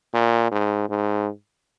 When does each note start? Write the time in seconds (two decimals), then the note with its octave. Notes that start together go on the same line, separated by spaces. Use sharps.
0.14 A#2
0.52 G#2
0.89 G#2